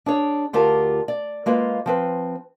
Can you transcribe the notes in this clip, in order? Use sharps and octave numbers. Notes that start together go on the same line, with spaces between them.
D4 G#4 C#5
D2 F4 G4 A#4 A5
D5
G#3 A#3 F4 B4
F3 C4 B4